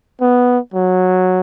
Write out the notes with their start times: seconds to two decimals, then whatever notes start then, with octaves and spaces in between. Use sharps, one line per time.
0.21 B3
0.74 F#3